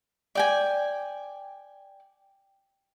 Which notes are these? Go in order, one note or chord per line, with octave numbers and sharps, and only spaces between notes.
D5 G5 G#5